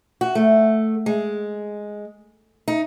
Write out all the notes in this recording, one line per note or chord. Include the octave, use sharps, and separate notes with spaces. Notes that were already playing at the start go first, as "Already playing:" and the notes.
F#4
A3
G#3
D#4